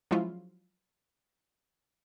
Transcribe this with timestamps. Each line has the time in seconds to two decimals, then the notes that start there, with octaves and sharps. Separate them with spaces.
0.11 F3 F#3 G#3 C#4 E4 F4